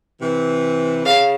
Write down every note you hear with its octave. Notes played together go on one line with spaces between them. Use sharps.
C3 E3
C#3 F5